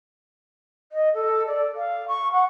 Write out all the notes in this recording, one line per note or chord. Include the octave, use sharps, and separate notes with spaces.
D#5
A4
D5
F5
C#6
F#5